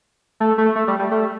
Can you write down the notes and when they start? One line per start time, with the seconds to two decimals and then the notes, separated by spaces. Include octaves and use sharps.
0.40 A3
0.58 A3
0.75 A3
0.88 G3
0.99 G3
1.11 A3